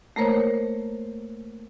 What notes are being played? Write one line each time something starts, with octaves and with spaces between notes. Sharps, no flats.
A3 A#3 A#4 C5 C#5